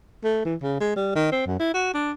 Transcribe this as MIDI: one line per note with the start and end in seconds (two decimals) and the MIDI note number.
0.24 0.40 57
0.45 0.55 52
0.62 0.78 49
0.81 0.96 56
0.96 1.14 55
1.15 1.28 51
1.32 1.42 60
1.46 1.55 42
1.59 1.73 64
1.74 1.90 66
1.94 2.12 62